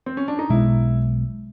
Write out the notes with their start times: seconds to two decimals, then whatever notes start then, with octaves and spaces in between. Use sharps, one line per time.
0.06 C4
0.17 C#4
0.28 D4
0.39 D#4
0.50 B1 B2 G#3 E4